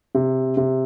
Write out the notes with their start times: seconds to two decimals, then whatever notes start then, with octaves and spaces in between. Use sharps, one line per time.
0.15 C3
0.57 C3